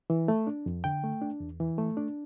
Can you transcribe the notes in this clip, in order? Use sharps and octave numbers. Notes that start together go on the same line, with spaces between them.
E3
A3
D4
F2
D3 G5
A3
D4
E2
E3
A3
D4